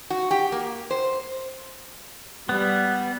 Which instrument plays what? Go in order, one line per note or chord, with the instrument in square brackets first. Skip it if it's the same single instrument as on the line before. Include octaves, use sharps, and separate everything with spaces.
[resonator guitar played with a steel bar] F#4
G4
A#3
C5
[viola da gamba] G3 [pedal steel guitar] B3